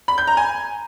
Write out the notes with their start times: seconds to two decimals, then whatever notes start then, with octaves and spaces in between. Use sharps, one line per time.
0.08 B5
0.18 G6
0.27 A#5
0.37 G#5